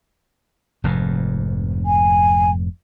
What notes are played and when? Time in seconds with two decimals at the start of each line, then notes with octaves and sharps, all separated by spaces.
0.84 F1 F2 G#2
1.86 G#5